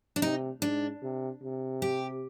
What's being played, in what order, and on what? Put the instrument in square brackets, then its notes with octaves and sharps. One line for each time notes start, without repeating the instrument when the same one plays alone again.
[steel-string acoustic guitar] D4
[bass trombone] C3 [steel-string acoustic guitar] D#4
[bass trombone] G#2 [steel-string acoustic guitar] D4
[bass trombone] C3
C3
[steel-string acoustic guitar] G4